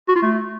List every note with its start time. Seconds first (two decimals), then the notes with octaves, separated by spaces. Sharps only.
0.09 F#4
0.15 F4
0.22 A3